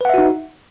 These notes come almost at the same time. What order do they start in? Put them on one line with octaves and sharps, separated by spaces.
B4 F#5 E5 F#4 D#4